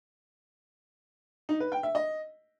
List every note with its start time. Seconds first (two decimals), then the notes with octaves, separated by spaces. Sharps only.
1.49 D#4
1.60 B4
1.72 G5
1.83 E5
1.95 D#5